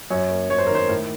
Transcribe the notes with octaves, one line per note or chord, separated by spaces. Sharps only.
F#2 C#5
A#3
F#2 C#5
C5
A#4
D#3 C5
A2 A#4